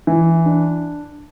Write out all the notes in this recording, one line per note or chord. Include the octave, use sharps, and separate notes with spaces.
E3
D4